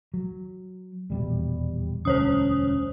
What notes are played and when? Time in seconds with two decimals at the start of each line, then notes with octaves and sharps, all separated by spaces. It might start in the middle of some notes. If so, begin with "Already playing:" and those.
0.14 F#3
1.10 D#1 E2 B2 G3
2.05 E1 D2 G3 C#4 C5 C#5 D#6